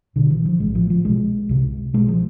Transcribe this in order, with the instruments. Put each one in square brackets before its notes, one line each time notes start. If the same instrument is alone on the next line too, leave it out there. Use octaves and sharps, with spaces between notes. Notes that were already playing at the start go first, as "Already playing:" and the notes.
[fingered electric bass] B1 B2 D3
E3
F3
A1 A2 G#3
F3
F3
B1 B2 G#3
C2 C3
B1 B2 G#3
F3